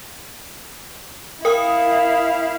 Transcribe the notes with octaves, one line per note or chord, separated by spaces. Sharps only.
E4 A#4 F5 G5 D#6